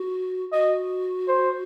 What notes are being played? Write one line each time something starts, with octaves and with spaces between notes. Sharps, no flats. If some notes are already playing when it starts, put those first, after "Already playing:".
Already playing: F#4
F#4 D#5
C5